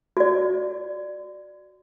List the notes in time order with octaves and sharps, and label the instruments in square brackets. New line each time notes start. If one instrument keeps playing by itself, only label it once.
[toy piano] F#4 D5